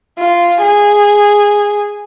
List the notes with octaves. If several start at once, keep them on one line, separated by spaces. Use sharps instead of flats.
F4
G#4